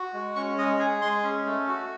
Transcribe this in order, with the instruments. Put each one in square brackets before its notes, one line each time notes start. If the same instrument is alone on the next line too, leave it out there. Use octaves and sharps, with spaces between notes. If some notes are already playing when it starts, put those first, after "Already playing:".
Already playing: [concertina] F#4
G#3
C#4 C#6
G#3 D#5
G#4 G#5
G#3 C6
C#4
A3
F#4